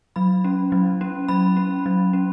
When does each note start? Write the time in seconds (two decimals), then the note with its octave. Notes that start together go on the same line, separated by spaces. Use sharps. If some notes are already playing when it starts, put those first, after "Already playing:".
0.16 F#3 B5
0.44 C#4
0.72 F#3
1.01 C#4
1.28 F#3 B5
1.57 C#4
1.86 F#3
2.13 C#4